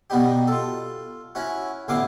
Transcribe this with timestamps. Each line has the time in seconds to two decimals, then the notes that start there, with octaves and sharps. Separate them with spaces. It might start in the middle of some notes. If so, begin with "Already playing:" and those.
0.10 B2 G3 B3 D#4 G4
0.47 F4 A4
1.35 C#4 E4 F#4
1.88 A1 D2 B3 E4 F5 D6